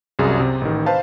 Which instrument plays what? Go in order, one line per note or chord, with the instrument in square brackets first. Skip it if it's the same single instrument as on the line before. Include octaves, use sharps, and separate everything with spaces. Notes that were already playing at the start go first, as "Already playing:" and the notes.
[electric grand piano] C2 F#2 G#4
C3
A1 D#3
B4 C5 F5 A5